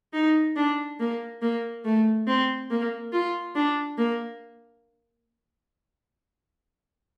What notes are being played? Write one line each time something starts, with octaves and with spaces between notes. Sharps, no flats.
D#4
D4
A#3
A#3
A3
C4
A#3
F4
D4
A#3